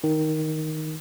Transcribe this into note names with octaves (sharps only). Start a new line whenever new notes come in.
D#3